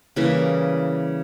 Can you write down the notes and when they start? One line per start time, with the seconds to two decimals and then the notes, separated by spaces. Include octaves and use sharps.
0.16 C#3 E3 G3 A#3